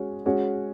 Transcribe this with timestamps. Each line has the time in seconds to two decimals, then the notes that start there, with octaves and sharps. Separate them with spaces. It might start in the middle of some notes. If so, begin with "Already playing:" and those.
Already playing: G#3 C#4 F#4
0.26 G#3 C#4 F#4